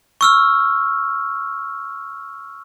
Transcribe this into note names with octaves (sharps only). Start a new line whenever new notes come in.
C#6 E6 F6